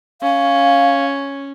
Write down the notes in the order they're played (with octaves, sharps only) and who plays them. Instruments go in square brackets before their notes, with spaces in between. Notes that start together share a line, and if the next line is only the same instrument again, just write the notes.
[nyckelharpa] C#4 [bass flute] F5